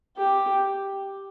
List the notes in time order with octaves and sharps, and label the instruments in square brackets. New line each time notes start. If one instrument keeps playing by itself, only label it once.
[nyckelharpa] G4